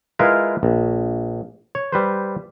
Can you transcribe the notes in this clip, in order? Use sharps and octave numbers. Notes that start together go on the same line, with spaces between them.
G#3 E4 F4 A#4 B4 F5
A#1
C#5
G3 B4 C5